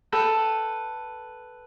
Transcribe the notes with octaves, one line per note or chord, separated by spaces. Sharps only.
A4 B4 G5